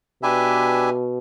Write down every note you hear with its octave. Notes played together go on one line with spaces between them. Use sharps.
B2 D4 G4 B4 E5 G#5